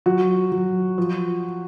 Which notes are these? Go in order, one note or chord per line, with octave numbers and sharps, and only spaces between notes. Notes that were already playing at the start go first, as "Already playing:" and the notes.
F#3 F#4
F#3
F3